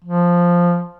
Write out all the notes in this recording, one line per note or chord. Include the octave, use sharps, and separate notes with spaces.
F3